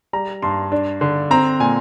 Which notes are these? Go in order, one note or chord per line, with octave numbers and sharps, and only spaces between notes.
G3 A#5
G2 C6
D4
D3
C4 A#5
A#2 G#5